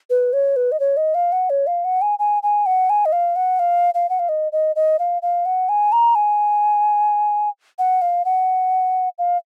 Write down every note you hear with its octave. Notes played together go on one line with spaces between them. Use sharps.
B4
C#5
B4
D#5
C#5
D#5
F5
F#5
C#5
F5
F#5
G#5
G#5
G#5
F#5
G#5
D#5
F5
F#5
F5
F5
F#5
F5
D#5
D#5
D#5
F5
F5
F#5
G#5
A#5
G#5
F#5
F5
F#5
F5